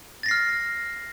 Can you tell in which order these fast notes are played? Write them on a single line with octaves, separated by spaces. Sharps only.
A6 A#6 C7 F6